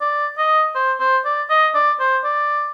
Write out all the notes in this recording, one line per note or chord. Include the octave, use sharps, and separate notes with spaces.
D5
D#5
C5
C5
D5
D#5
D5
C5
D5